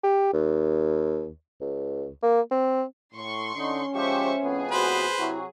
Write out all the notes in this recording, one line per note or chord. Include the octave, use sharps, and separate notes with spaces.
G4
D#2
C#2
A#3
C4
A2 C6 C#6
D3 C#4 D#4
F3 G#3 G4 C5 E5 C#6
F2 A2 B3 G#4
F#4 B4 C5
C3 F#3 E4 F#4